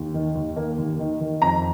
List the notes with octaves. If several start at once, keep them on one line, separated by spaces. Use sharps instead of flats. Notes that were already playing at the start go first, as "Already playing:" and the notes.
Already playing: D#2
D#3
D#2
A#3
D#2
D#3
D#3
F2 A#5